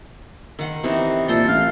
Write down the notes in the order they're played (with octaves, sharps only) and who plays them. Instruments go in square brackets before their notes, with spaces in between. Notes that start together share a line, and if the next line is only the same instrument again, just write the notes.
[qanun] D#3 F#5 C6
C3 E3 D#4
[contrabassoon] A#2 [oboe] A4 [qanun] C5 G5 C6
[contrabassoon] A1 [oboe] F5